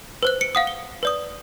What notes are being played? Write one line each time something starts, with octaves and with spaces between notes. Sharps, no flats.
B4 C5 F#6
C#7 D7
F5 F#5 D#6
G7
B4 D5 D#6